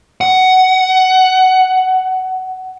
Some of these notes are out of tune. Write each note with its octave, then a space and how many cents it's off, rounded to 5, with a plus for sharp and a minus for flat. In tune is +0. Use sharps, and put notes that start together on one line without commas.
F#5 +15